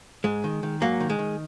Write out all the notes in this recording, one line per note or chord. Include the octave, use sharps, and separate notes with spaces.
G#2 G#3
D#3
D#3
G#2 F#3 A#3
D#3
G#3
D#3